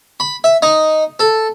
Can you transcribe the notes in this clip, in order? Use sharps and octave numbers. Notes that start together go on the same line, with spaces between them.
B5
E5
D#4
A4